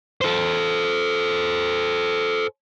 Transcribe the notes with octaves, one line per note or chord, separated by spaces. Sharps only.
A4 C5